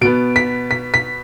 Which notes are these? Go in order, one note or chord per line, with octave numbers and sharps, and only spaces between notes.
B2 B3 D7
B6
B6
B6